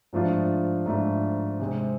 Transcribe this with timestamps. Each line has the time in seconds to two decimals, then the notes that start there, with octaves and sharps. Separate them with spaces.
0.13 G#2 F3 A3 D4 F4
0.86 G#2 F3 A3 D4 F4
1.59 C3 G#3 C4